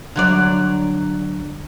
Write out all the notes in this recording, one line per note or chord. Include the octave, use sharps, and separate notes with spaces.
D3 F#3 D5